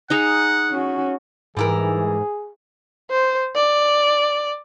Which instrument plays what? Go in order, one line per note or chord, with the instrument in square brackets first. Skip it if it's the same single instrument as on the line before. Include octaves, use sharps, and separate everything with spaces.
[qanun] D#4 G#4 A#5 [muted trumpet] F#5
[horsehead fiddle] C#4 F#4
[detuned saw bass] G#2 [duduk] E3 [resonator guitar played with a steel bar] G3 E4 A#4 [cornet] G#4
[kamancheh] C5
D5